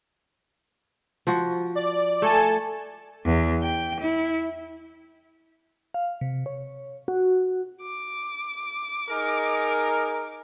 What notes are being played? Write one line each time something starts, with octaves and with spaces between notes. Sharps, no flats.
F3 F#4
D5
A3 A4 G#5 A5
E2
G5
E4
F5
C3
C#5
F#4
D6
D#4 G#4 A#4